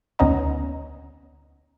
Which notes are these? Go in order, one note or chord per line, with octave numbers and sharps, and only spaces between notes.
D2 B3 C#4 D#4 D#5 A#5